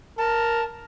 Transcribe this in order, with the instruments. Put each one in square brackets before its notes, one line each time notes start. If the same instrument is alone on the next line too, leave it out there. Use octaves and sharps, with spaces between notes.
[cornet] A#4 [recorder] A5